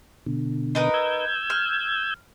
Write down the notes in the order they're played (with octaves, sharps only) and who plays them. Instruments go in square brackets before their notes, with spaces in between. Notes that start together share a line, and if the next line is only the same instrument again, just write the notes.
[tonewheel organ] B2 D3
[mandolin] D#4 A#4 B4
[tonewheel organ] E6 G6 G#6
[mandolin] F6